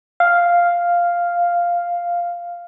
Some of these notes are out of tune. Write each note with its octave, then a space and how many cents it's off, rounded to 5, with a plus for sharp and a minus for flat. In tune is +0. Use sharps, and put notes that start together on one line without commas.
F5 +0